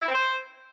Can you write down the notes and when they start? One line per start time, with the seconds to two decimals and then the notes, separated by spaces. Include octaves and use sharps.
0.02 E4
0.08 C4
0.15 C5